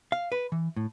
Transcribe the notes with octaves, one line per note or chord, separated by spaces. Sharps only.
F5
B4
E3
A2